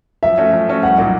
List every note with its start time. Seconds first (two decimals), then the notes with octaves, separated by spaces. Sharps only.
0.23 F3 E5
0.38 A3 C#4 F#4
0.53 F3
0.68 A3 C#4 F#4
0.83 C2 F#5
0.97 A#2 F#3 A#3 D#4